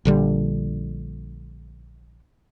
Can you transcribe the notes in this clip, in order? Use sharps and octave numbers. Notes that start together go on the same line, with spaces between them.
A#1 D3 G3